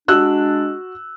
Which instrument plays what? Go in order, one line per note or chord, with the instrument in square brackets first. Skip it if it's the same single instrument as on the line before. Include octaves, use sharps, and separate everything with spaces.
[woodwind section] G#3 D4 [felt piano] F#4 E6 F#6